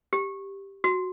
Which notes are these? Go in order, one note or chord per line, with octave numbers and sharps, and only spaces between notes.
G4
F#4